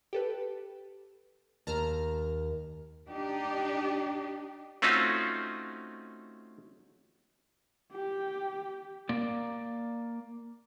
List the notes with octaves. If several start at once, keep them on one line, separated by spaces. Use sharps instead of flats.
G4 A4 B4
D#2 A5 A#5 F6
D4 D#4 G4
A3 C4 C#4 D#4 F4 F#4
G4
A#3 D5